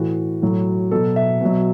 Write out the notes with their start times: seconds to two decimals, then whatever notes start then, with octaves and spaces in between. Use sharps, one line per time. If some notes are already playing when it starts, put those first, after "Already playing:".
Already playing: A2 E3 F#4
0.42 A2 F#3
0.91 B2 F#3 A4
1.16 E5
1.41 B2 F#3